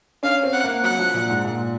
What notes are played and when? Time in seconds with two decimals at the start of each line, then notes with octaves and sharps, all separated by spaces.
0.23 C#4 F5
0.43 C4
0.53 F#5
0.64 A#3
0.83 F#3 F#5
0.99 F3
1.14 A#2
1.30 G#2
1.45 A#2